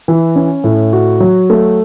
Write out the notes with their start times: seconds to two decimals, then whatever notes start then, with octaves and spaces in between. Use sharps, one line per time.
0.08 E3
0.36 C#4
0.64 A2
0.93 F#4
1.20 F#3
1.50 A3